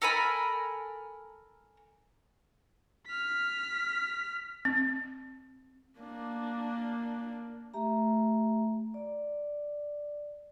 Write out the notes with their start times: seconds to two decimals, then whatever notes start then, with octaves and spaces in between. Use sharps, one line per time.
0.02 A4 A#4 G#5 B5
3.07 F6 B6
4.65 C4
5.99 A#3 D4
7.74 A3 G4 E5 A#5
8.94 D5